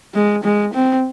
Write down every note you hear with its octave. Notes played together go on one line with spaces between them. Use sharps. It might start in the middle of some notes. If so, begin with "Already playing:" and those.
G#3
G#3
C4